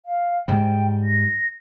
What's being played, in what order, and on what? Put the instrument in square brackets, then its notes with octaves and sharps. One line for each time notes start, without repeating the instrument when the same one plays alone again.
[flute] F5
[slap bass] G#2 G3 [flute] G5
[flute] A#6